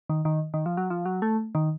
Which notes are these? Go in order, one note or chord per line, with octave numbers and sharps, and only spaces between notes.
D#3
D#3
D#3
F3
F#3
F3
F#3
A3
D#3